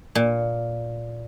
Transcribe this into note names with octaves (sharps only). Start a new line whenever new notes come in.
A#2